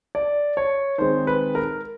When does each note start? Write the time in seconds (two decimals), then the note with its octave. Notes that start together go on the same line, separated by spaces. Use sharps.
0.15 D5
0.57 C#5
0.98 D#3 G#3 C4 D#4 C5
1.27 B4
1.55 A#4